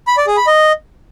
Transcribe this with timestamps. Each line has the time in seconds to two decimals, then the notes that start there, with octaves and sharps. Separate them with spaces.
0.07 B5
0.17 D5
0.27 G#4
0.37 B5
0.47 D#5